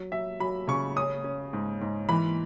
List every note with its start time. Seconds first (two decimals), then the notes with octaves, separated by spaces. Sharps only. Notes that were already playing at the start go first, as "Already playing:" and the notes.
Already playing: F#3
0.12 F#3 E5
0.40 F#3 B5
0.68 C#3 C#6
0.96 C#4 D#6
1.24 C#4
1.53 G#2
1.81 G#2
2.09 E3 B5